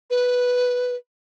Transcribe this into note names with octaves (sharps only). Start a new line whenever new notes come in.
B4